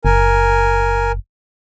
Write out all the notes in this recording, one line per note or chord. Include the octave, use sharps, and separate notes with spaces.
F#1 A#4 G#5